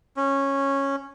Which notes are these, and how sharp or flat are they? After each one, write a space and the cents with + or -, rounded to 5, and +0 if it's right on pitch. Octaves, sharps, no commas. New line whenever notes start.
C#4 -10